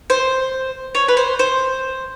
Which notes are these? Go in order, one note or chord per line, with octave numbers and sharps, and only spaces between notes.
C5
C#5
B4
C5
C5